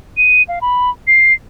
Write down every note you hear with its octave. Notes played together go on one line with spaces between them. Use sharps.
D#7
F5
B5
C7